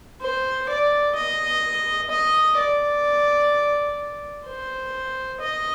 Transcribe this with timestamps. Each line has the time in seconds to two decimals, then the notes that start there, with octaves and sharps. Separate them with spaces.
0.21 C5
0.68 D5
1.16 D#5
2.10 D#5
2.57 D5
4.46 C5
5.41 D#5